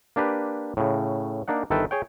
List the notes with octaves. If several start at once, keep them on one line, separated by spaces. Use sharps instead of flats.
A#3 D4 G4 B4
A2 C#3
A#3 D4 D#4 F#5
G1 D#3 A4 B4 E5 G5
G#4 C#5 G5